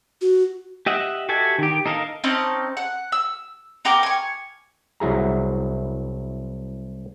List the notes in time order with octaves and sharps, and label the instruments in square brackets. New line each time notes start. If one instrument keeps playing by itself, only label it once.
[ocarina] F#4
[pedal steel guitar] G4 D#5 E5 F#5
F#4 G4 A4 E5 G#5
D#3 G4
D#4 A4 A#4 D#5 F5
[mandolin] C4 C#4 D#4 A5
F#5
E6
B3 A#4 G5 D6
G#5 C#6
[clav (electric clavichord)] C2 F#3 E4 G#4 A#5